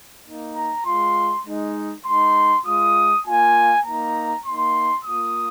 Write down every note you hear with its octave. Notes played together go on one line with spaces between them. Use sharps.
A#3 D#4
A#5
G#3 F4 C6
G#3 D#4
G#3 D#4 C6
G#3 F4 D#6
A#3 F4 G#5
A#3 D#4 A#5
A#3 D#4 C6
A#3 F4 D#6